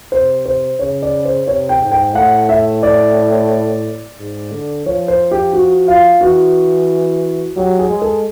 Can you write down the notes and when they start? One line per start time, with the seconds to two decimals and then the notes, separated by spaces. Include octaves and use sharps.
0.12 C3 C5
0.46 C5
0.79 C#3 C#5
1.02 D5
1.25 C5
1.47 C3 C#5
1.69 G5
1.82 G#2
1.92 G5
2.14 A2 F#5
2.49 E5
2.83 D5
4.19 G#2
4.52 D3
4.86 F3 C#5
5.08 C5
5.31 G4
5.53 F#4
5.88 F4
6.21 E3 F#4
7.56 F#3 G4
7.79 G#4
7.90 G#3
8.02 A4